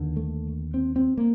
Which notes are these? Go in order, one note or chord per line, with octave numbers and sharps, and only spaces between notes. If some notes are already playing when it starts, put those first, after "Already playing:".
Already playing: D#2 D3
A3
C4
C4
A#3